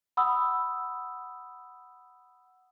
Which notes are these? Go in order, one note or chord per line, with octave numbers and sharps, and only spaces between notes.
F#5 B5 D#6 E6